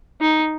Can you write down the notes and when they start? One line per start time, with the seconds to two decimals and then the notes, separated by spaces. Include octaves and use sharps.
0.21 D#4